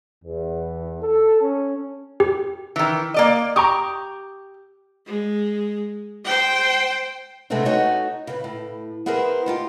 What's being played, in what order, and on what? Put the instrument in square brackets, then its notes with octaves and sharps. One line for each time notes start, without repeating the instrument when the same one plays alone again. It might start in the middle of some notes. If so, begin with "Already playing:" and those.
[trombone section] E2
A4
C#4
[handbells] G4
[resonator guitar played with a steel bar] D#3 E3
A#3 D5 D#5
[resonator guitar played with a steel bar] G4 [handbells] A#5 C#6 D#6
[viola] G#3
C5 G5
[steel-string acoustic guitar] C3 G#3 A3 B3 C4 D4
A3 D#4 F#4 C#5
C#3 B4
A2
B3 E4 G#4 A#4 C5
D#4 F4 G4